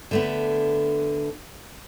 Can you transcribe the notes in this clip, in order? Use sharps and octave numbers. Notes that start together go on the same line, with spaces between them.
D3 A3 B3